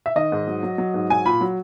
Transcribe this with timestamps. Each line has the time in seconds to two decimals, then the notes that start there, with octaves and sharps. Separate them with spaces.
0.06 E5
0.16 D#3 D#5
0.32 G#2
0.47 F#3
0.63 F#3
0.78 F#3
0.94 G#2
1.10 F#3 G#5
1.25 A#2 B5
1.41 F#3